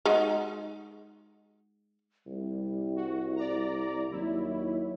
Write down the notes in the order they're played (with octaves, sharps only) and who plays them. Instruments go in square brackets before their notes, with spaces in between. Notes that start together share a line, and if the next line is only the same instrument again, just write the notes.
[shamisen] G#3 D#4 F#4
[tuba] C2 [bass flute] G3
[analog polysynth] F#4
D5 A#5
[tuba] D#2 [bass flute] F#3 [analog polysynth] E4